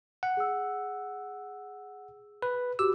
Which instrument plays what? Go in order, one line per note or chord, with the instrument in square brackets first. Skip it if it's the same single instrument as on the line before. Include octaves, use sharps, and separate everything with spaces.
[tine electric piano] F#5
[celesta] G#4 E6
[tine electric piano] B4
[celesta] F#4 G4 D6 [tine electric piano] E6